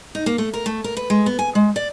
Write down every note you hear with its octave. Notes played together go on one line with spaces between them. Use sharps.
D#4
A#3
A3
A#4
A3
A#4
B4
G#3
B3
G#5
G#3
D5